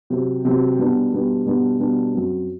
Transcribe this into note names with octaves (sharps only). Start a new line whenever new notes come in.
C3 F#3 C4
C3 F#3 C4
B2 G3 B3 D4
B2 G3 B3 D4
B2 G3 B3 D4
B2 G3 B3 D4
F#2 F#3 C4